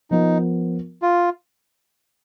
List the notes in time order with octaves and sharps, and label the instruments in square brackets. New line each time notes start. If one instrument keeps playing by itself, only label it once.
[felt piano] F3 B3 F4 A#4 [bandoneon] D#4
[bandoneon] F4